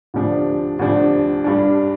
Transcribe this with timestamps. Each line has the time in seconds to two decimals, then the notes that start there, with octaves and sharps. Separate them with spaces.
0.14 D2 C3 F3 D4
0.79 D2 C3 F3 D4
1.44 G2 G3 D4